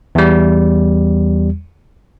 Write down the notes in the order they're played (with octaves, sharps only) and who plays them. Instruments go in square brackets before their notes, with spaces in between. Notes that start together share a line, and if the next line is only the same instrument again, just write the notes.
[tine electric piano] E2 G3